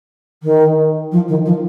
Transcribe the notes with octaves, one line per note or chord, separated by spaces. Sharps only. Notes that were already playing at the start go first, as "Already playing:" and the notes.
D#3
F3
D#3
F3